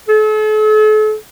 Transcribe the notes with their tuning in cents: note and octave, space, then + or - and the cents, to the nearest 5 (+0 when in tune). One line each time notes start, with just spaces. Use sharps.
A4 -40